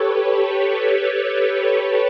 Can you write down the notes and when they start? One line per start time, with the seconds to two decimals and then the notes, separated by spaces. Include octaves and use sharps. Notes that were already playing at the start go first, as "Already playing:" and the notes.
Already playing: G4 A4 B4 C#5
0.21 G4 B4